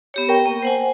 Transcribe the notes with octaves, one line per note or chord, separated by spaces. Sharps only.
B3 G4 C#5
A#4 G5 C#6
A#3
C5 F#5 G#5